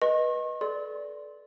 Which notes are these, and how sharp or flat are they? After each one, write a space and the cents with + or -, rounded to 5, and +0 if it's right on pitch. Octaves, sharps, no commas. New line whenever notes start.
B4 -15 D#5 +0 C#6 -45
A4 -35 D5 -10 C6 +0